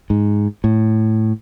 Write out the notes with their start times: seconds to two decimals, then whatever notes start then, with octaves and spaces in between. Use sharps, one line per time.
0.10 G#2
0.64 A2